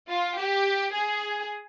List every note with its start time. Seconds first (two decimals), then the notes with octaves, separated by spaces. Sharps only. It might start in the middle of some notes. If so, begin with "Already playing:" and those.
0.10 F4
0.39 G4
0.94 G#4